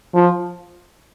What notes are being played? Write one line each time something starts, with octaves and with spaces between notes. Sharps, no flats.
F3